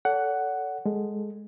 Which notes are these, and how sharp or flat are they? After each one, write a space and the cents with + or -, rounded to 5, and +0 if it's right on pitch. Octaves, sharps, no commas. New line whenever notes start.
A4 +5 D5 -45 F#5 +5
G#3 +0 A4 +0